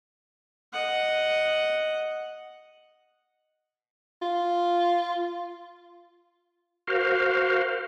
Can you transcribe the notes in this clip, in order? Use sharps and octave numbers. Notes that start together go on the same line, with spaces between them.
D#5 F#5
F4
F#4 A#4 C5 F5